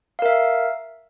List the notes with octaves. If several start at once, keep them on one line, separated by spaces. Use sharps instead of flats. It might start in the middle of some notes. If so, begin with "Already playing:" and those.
A#4 E5 F5